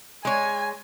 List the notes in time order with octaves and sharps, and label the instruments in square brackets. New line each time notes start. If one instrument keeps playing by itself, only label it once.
[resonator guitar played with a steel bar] G#3 C#5 [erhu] G#5